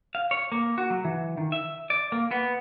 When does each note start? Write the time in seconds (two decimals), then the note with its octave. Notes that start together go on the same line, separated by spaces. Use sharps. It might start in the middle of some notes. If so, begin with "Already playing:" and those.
0.15 F5
0.31 C#5
0.52 A#3
0.78 F#4
0.90 F#3
1.05 E3
1.37 D#3
1.52 E5
1.90 D5
2.12 A#3
2.31 B3